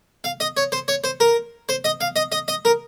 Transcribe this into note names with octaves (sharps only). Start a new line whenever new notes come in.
F5
D#5
C#5
C5
C#5
C5
A#4
C5
D#5
F5
D#5
D#5
D#5
A#4